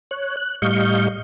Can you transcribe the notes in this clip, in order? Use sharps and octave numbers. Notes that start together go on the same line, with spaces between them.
C#5 F#6
F#6
A2 G3 D#5 F5 C#6 G6